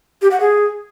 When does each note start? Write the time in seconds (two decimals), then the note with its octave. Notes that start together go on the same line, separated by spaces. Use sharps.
0.22 G4
0.31 F#5
0.40 G#4